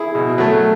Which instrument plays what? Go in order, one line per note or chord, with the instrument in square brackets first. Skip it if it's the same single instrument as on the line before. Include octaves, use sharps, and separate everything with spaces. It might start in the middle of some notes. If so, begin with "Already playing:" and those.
Already playing: [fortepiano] E4 G#4
B2
F#3 A3